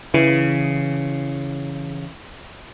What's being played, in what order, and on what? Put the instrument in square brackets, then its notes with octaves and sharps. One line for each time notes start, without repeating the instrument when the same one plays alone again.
[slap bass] C#3 [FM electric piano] E3